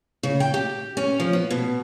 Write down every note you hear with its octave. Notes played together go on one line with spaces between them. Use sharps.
C#3
G5
G4
C#4
F3
B3
B2